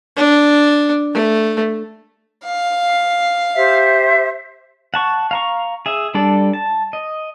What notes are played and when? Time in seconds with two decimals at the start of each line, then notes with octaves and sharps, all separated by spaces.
0.17 D4
1.14 A3
2.45 F5
3.55 G4 C5 E5
4.94 F#5 A5 C#6
5.31 F5 A#5 C#6
5.86 G#4 E5
6.14 G3 D4 A4 D5
6.53 A5
6.93 D#5